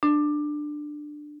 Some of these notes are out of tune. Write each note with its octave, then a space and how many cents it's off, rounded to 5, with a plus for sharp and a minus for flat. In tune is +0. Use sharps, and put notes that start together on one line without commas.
D4 +15